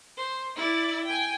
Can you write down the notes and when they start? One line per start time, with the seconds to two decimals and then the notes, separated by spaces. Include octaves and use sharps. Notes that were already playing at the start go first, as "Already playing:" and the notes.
0.17 C5
0.56 E4 D5
1.06 G5 G#5